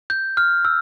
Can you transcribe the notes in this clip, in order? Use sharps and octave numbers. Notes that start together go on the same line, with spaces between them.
G6
F6
E6